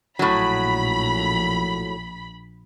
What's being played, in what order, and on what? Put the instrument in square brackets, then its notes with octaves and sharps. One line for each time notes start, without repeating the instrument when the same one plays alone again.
[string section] A#1 B5 [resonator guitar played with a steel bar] A2 F#3